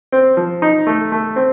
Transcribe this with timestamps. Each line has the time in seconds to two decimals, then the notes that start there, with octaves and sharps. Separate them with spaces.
0.12 C4
0.37 F3
0.62 D#4
0.87 A3
1.12 A3
1.36 C4